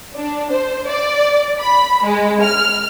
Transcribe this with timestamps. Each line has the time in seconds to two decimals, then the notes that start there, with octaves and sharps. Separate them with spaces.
0.15 D4
0.51 C5
0.88 D5
1.59 B5
2.04 G#3
2.42 F6